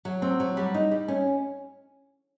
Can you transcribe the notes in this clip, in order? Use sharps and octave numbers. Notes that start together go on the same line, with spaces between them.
F#3
C4
F#3
G3
D#4
G3
C#4